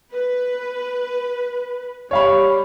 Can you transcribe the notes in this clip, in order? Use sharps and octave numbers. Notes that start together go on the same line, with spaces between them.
B4
G3 C#5 F5 B5